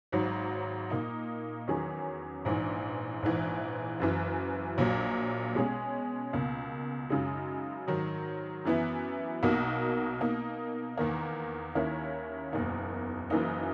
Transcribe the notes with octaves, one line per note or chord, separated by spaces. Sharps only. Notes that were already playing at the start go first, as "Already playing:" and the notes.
G#1 G#2 F#3
A#2 A#3 D#4
E2 D#3 F#3 C#4 G#4
A#1 G#2 E3
A#1 G#2 E3
F#1 F#2 E3
A#1 A#2 F#3
B2 G#3 C#4 G#4
C#2 B2 A#3
F#2 C#3 G#3 D#4
G#2 D#3 F#3
F#2 E3 B3 E4
B1 B2 A#3 D#4 F#4
B2 A#3 D#4
E2 D#3 A#3
D#2 D#3 A#3 C#4 E4
F#1 E2 B2 A#3 D#4
F#1 F#2 E3 A#3 D#4